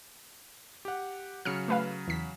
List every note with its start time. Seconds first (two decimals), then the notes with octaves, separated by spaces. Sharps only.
0.85 G4 F#5
1.45 C#3 F#3 F6 C#7
1.68 A3 B4 F5
2.08 E2 B6